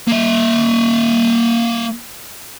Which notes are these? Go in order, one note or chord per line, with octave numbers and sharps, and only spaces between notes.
A#3 E5